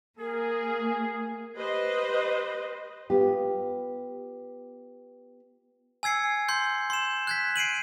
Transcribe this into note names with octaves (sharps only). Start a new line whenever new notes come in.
A#3 G#4 A#4
G4 B4 C5 D#5
B3 F4 G4
G#5 E6 G#6 C7 C#7
C6 G6
C6 E7
F#6 G#6 B6
C7 D7 D#7 F#7